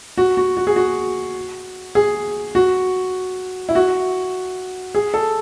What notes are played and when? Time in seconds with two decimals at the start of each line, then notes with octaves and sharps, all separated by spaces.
0.17 F#4
0.37 F#4
0.57 F#4
0.67 G#4
0.76 F#4
1.95 G#4
2.55 F#4
3.69 E4
3.75 F#4
4.95 G#4
5.14 A4